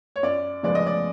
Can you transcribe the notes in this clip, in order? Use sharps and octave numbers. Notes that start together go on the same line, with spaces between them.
C#5
F#2 D5
C#3 F3 G#3 B3 D5
D#5
D5